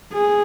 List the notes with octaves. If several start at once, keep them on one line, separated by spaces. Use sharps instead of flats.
G#4